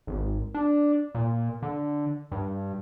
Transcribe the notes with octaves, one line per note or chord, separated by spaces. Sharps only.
G#1
D4
A#2
D3
G2